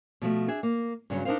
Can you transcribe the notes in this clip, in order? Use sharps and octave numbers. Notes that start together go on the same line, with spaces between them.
B2 F3 F#3 A3
D4 G#4 E5
A#3
G2 C#3 F#3
D4 D#4 A#4 C5 F5